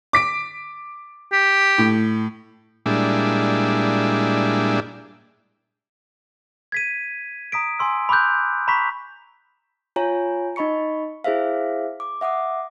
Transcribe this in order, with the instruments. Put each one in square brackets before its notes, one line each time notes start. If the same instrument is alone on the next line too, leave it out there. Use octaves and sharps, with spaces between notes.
[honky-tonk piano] D6 B6 D7
[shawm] G4
[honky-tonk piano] A2
[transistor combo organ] A#2 G3 G#3 D4 E4
[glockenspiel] G#6 B6 D#7
A#5 D#6 B6 D7
G#5 A#5 C6 E6
B5 C6 D6 E6 F#6 G6
A#5 B5 C#6 B6
[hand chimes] F4 C#5 G#5 A#5
D#4 D#5 B5 C#6 C#7
E4 G#4 C5 E5 F5
D6
E5 F#5 D6 D#6